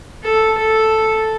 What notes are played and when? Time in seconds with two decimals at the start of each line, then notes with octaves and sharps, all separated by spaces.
0.23 A4
0.57 A4